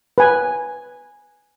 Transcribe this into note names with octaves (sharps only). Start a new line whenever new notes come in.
B4 G#5